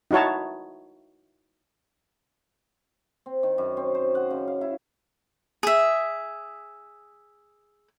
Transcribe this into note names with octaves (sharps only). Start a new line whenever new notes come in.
D#4 E4 F#4 C#5 A5
C4
D#3
F#2
C4
C5
F#5
C#3
F5
E4
G#4 E5